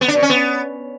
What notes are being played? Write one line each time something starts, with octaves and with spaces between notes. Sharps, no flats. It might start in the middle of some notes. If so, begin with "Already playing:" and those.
B3
D4
B2
C#4
B3